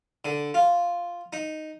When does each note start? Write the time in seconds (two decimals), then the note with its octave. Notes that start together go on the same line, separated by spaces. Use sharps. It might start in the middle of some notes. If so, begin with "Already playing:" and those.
0.25 D3
0.54 F4
1.33 D#4